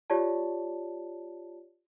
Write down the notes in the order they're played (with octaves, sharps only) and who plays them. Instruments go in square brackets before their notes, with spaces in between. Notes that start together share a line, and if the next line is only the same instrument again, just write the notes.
[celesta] F4 G4 C#5 D5 A5